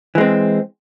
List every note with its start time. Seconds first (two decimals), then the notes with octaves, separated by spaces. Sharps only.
0.15 E3
0.18 G#3
0.21 C4